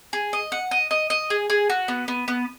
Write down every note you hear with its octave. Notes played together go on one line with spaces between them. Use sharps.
G#4
D#5
F#5
D#5
D#5
D#5
G#4
G#4
F#4
B3
B3
B3